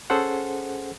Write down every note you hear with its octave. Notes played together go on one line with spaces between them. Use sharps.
C#4 G#4 A4 C5 F#5